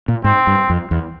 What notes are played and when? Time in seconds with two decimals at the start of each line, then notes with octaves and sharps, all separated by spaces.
0.08 A#2
0.24 G#2 C4
0.47 G2
0.70 F2
0.91 E2